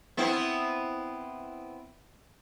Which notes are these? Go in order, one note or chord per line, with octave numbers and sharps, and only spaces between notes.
B3 C4 E4